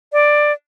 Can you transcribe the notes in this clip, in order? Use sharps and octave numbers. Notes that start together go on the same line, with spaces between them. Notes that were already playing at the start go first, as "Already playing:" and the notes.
D5